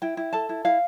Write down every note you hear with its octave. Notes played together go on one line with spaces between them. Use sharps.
E4 G5
E4
A4 A5
E4
E4 F5